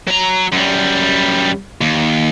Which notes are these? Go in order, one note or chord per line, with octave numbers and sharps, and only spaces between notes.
F#3 A#5
F#2 G3
D#2